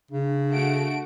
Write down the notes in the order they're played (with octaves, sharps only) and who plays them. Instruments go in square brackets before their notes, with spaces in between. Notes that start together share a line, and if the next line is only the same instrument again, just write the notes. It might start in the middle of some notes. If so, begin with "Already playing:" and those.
[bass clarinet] C#3 [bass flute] D4
[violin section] A3 F#4 D7